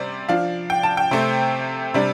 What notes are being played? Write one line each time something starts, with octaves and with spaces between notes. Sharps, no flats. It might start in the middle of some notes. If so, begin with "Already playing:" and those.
Already playing: C3 G3 C5 D5
F3 D4 F5
G5
A5
G5
C3 A3 C4
C3 G3 D4